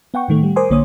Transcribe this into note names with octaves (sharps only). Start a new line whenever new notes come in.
B3 F#5 G5 C#6
A2 D#3 A3
G3
A#4 C5 G#5 C6 D6 D#6
A#1 D3 A#3 C#5 D#6